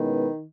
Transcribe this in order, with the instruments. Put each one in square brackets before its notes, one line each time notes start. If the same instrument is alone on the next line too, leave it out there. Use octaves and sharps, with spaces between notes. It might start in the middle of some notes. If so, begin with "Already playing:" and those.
Already playing: [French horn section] B2 G#3 C#4 E4 B4 [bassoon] D#3